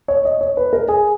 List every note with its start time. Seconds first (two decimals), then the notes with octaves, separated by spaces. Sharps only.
0.08 C#5
0.25 D#5
0.41 C#5
0.57 B4
0.73 A#4
0.88 G#4